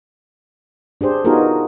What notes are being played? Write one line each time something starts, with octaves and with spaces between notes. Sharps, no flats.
D4 G4 G#4 C5
B3 D#4 F4 F#4 G#4 A#4